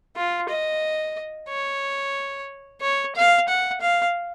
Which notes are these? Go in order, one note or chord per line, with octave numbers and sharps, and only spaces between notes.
F4
D#5
C#5
C#5
F5
F#5
F5